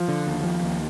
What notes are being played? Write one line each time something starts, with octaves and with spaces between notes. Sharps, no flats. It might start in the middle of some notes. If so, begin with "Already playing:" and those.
Already playing: F3
D3
D#2
F3
D#2